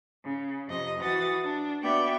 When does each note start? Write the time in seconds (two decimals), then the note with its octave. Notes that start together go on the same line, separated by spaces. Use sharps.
0.24 C#3
0.68 F2 C3 D#5
1.01 E3 F#4 D#6 A6
1.42 D4
1.82 B3 F#4 D5 E5 G5